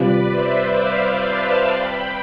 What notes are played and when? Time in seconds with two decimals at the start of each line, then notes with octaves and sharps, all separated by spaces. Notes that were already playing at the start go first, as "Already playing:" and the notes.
Already playing: C3 G3 C4 F4 B4 D5
0.28 C5 E5
0.74 D5 F5
1.20 F5 A5
1.66 G5 B5